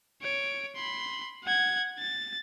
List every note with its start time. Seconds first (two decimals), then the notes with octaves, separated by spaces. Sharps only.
0.22 C#5 D7
0.76 B5 C6
1.44 F#5 G#6
1.99 A6